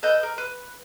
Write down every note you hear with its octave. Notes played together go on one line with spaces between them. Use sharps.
A4 B4 D#5 G6
A#4
B4